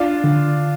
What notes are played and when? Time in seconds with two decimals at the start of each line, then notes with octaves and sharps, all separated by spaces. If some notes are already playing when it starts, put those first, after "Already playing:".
Already playing: D4 F4
0.24 D3